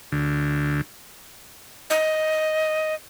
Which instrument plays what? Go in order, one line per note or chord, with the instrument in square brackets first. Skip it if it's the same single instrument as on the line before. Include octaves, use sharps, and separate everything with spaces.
[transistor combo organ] D2
[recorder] D#5